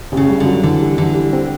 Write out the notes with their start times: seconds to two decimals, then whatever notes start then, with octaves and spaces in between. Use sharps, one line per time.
0.12 A1
0.17 C#3
0.29 G2
0.40 D3
0.46 F#3
0.63 D3 E3
0.81 G3
0.97 D3 E3
1.14 G3
1.33 C4